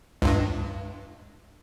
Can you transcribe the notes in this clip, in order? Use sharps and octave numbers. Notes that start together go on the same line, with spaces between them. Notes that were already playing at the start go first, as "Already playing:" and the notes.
C#2 G2